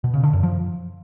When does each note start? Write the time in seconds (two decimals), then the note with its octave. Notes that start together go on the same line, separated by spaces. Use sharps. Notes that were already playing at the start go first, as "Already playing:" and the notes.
0.04 B2
0.14 C#3
0.23 D3
0.33 F#2
0.43 F3